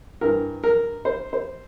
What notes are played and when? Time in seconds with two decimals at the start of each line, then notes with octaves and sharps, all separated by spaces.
0.21 G2 E3 A#4
0.64 A#4
1.05 C5
1.33 C5